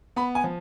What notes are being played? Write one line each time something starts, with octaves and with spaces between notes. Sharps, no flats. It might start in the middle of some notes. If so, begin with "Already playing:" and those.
B3 B5
G#5
F3